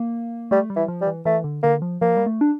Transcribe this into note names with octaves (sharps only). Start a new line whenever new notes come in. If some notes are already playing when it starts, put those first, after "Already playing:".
Already playing: A#3
G3 A3
G3
E3
F3
G3
E3
E3 A3
D3
D3 A#3
F3
F3 A#3
G3
A3
D4